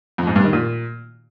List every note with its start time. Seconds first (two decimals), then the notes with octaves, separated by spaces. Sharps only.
0.18 F2
0.27 G#2
0.36 G2
0.44 D#3
0.53 A#2